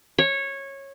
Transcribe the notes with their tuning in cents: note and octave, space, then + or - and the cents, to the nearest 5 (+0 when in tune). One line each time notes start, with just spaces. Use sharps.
C#5 -15